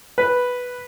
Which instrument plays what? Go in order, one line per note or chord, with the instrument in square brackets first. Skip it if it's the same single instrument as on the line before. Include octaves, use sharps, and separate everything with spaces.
[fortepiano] B4